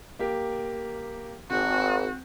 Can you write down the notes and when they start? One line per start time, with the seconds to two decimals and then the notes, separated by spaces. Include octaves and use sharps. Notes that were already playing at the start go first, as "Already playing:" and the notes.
0.19 A#3 G4
1.50 G#1 C4 F#4